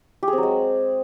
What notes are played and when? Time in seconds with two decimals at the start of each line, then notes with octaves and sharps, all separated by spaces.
0.23 G4
0.28 G#4
0.33 C4
0.38 F#3
0.43 G#3